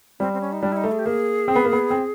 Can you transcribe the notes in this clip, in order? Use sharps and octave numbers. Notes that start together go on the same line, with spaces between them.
G3 C4
C4
C#4
D#4
G3 D4
E4
D#4
A3
G#4
G4
A#3 G#4
C4
B3
A#3
B3
C4